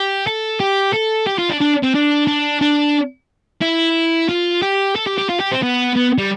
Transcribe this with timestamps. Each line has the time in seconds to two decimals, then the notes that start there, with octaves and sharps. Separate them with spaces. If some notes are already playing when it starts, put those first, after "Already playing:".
Already playing: G4
0.27 A4
0.60 G4
0.94 A4
1.27 G4
1.39 F4
1.49 D4
1.60 D4
1.83 C4
1.94 D4
2.27 D4
2.61 D4
3.61 E4
4.29 F4
4.62 G4
4.95 A4
5.07 G4
5.18 G4
5.29 F4
5.40 G4
5.52 C4
5.62 B3
5.96 B3
6.18 G3